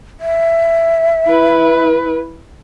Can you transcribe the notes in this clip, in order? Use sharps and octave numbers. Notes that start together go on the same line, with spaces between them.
E5
E4 B4